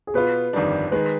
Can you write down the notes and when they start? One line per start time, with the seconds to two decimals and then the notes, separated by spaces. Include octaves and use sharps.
0.07 G#4
0.14 B2 B3 F4 B4
0.53 G1 F2 D#3 G3 D4
0.92 D#3 G#3 B4